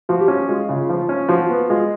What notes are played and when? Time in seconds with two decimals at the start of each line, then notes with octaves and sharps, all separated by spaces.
0.09 F3 F#4
0.21 G4
0.28 C#4 F#4
0.49 G#3 F4
0.69 C#3
0.89 F3
1.09 C#4
1.29 F3 F#4
1.49 B3 F#4
1.70 G#3 F4